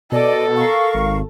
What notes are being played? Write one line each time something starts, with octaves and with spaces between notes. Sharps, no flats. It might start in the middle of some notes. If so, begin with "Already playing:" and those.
B2 A4 D5 D#5
A#4 F5 C#6
G#1